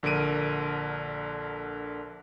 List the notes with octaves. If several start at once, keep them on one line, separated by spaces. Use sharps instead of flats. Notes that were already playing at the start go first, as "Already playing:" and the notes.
A#1 D3 A#4 D7 D#7